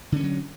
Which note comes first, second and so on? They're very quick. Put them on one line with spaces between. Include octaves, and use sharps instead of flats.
D3 C#4 E3 F#3